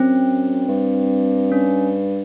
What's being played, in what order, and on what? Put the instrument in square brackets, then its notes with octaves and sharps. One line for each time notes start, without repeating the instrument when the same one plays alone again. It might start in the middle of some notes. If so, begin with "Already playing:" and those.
Already playing: [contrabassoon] F#2 [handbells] C4
[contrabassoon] G2
[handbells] C#4